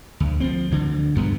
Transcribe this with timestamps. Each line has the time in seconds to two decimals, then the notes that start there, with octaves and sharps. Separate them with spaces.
0.20 D2
0.40 F3 F#3 C4
0.71 D2 D3
1.15 D2 G2 B3